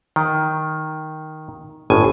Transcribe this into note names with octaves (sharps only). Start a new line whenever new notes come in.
D#3
G1 A2 G#5